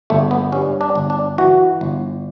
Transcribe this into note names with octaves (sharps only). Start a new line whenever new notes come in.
G1 A3
B3
G2 C#4
D4
G1
D4
E3 F#4
G1